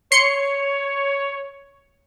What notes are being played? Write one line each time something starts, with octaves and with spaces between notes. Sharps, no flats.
C#5 C6 C#7